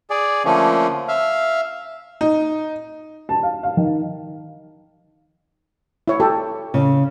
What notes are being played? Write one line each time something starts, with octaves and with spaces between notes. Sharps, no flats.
G#4 D5
D3 F3 A3 A#3 C#4
E5 F5
D#4
A5
F5
F5
D#3
E4 C#5
G4 A4
C#3